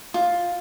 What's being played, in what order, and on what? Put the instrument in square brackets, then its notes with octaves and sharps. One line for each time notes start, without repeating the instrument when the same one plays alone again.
[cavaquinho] F4